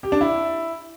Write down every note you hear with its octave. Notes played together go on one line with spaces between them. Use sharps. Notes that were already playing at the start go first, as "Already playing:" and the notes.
G4
D4
E4